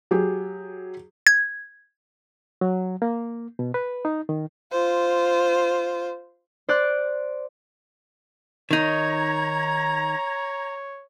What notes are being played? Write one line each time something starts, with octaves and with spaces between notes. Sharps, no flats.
F#3 G4 G#4
G#6
F#3
A#3
B2
B4
D#4
D#3
F4 C5
C5 D5 F#6
D#3 D#4 C#5 A#5 G#6